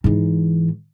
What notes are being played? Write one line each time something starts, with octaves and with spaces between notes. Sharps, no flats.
G#2 E3